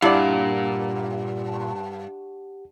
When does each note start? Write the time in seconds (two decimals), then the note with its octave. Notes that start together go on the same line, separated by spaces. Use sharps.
0.02 G2 A#2 E4 G4 D5 F5 F#5